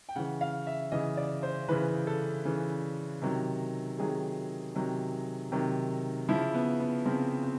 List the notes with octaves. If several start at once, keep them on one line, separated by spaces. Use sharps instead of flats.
G5
C#3 E3 F#5
F5
E5
C#3 E3 D#5
D5
C5
C#3 E3 B4
A4
C#3 E3
C3 D#3 F#3
C3 D#3 F#3 G#4
C3 D#3 F#3
C3 D#3 F#3
C#3 F3 E4
B3
B3
C#3 F3 C4
C4